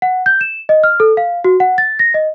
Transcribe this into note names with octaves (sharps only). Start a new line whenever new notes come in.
F#5
G6
E7
D#5
F6
A4
F5
F#4
F#5
A6
A#6
D#5